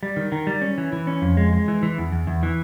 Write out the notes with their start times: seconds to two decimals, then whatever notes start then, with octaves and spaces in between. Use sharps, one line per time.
0.03 G3
0.17 D#3
0.32 D#3
0.47 G3
0.62 C#4
0.78 E3
0.93 E3
1.07 C#4
1.22 F2
1.37 G#3
1.53 G#3
1.68 E3
1.83 E3
1.98 E2
2.12 E2
2.27 E2
2.43 E3